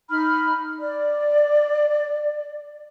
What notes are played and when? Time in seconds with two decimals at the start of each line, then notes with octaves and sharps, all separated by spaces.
0.09 D#4 B5 F6
0.80 D5